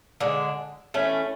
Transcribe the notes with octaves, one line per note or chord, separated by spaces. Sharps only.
D3 G#3 D4
E3 A3 C#4